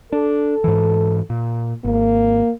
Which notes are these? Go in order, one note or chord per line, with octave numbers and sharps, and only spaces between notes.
D4 A4
G#2 E3
A#2
G#1 A#3